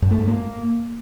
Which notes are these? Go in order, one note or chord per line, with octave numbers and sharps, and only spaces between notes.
F#2
A3
G#2
A#3